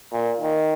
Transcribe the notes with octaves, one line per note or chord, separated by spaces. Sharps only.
A#2
D#3